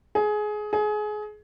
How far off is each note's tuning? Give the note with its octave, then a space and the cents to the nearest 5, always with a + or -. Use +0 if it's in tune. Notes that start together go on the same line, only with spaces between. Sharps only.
G#4 +20
G#4 +25